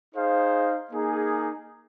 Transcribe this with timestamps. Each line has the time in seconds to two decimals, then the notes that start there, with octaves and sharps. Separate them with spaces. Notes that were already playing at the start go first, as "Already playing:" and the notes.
0.14 D#4 G#4 C5 F5
0.91 A#3 D#4 G#4